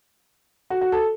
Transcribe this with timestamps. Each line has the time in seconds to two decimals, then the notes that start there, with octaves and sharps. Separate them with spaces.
0.70 F#4
0.81 F#4
0.92 A4